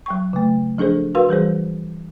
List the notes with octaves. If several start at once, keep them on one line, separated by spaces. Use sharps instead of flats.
F#3 G5 C#6
C#3 A3
F3 D4 G#4 A4 C5
F#4 A#4 B4 F5 C6 E6
E3 G3 G#4 C5